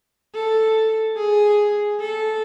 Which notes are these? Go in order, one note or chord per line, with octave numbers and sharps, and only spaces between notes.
A4
G#4
A4